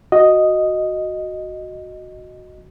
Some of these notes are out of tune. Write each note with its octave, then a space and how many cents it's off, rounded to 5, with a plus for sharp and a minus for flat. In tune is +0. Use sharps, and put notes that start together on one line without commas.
F#4 +0 D#5 +0